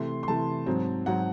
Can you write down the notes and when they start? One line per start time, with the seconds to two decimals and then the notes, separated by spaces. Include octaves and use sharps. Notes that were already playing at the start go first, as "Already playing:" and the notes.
Already playing: C3 E3 A3 C6
0.23 C6
0.27 C3 E3 A3 A5
0.66 G#2 F#3 C4
1.06 G#2 F#3 C4 F#5